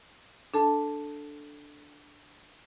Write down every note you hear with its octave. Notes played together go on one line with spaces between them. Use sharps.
D4 A4 A5